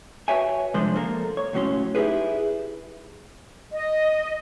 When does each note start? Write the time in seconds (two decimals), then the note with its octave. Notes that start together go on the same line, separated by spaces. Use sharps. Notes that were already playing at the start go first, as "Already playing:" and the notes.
0.28 F#4 B4 C#5 E5 G5 G#5
0.74 C2 D3 F3 G#3 D4 C5
0.95 A#3 A4 A#4
1.37 C#5
1.53 C#2 A2 F#3 C#4 C6
1.95 D#4 E4 G4 G#4 B4
3.72 D#5